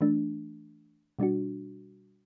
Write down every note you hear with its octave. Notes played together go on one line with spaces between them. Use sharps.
E3 A3 D4
B2 G3 D4 F#4